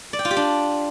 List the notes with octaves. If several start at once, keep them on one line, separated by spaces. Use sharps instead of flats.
D5
G5
F4
G4
D4